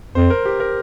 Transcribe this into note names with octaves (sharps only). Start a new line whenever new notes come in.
F2 C5
A#4
G4
A#4